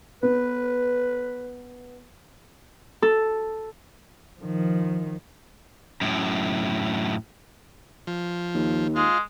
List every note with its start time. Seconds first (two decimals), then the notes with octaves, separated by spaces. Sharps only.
0.23 B3 B4
3.02 A4
4.39 D#3 F3
6.01 F#2 A2
8.07 F3
8.55 D#2
8.96 G#3 F4